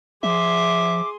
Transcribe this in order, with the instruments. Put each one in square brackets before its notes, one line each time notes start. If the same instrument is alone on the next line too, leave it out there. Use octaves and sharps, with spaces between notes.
[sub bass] F3 [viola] G#4 C6 [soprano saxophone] E5 [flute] D6